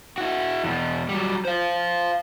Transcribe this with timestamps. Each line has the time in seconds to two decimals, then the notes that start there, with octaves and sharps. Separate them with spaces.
0.18 E4 F#4
0.64 E2 B2
1.09 F#3 G3
1.45 C5 F5